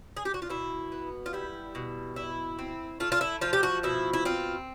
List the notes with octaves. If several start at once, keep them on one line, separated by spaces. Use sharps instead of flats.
G#4
G4
F#4
F4
B2 E4
B3
F4
G3 E4
B2
E4
C4
A3 F4
F4
E4
F3 F4
G4
F#4
B2 E4
E4
C4 F4